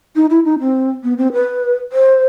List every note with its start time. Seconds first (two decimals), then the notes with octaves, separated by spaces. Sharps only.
0.16 D#4
0.30 E4
0.45 D#4
0.60 C4
1.03 B3
1.18 C4
1.33 B4
1.92 C5